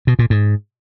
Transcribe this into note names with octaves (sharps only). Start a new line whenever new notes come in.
B2
A#2
G#2